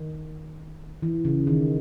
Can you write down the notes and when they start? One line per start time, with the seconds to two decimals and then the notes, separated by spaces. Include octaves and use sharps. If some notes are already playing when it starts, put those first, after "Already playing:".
Already playing: D#3
1.03 E3
1.25 C#3
1.47 D#3